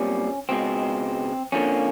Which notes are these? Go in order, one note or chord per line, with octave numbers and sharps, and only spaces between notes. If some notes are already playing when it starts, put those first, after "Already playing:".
Already playing: B1 A#2 G3 C4 C#4
C#2 B2 G#3 C4
F2 D3 F3 A#3 C#4